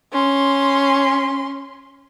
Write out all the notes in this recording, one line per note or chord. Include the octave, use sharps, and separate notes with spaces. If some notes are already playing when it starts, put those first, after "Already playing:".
C#4 C6